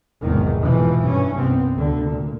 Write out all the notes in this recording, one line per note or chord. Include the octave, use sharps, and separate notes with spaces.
F1 B1 E2 G#2 D#3
B2 E3 F3
G2 C#4
G1 C2 B3 C4
D2 D3
A#2